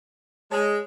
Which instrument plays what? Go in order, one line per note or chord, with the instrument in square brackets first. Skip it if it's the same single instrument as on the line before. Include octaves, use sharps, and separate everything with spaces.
[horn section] G#3 [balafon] C#5 A5